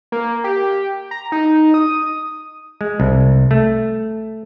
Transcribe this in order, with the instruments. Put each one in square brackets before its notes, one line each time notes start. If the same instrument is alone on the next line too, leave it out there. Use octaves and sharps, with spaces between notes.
[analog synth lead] A#3
G4
A#5
D#4
D#6
[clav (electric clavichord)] G#3
C2
A3